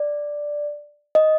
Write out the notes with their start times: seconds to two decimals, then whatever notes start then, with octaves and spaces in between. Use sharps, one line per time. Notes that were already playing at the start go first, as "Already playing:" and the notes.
Already playing: D5
1.15 D#5